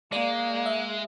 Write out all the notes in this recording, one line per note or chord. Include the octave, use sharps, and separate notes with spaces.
G#3 A#3 D5
E5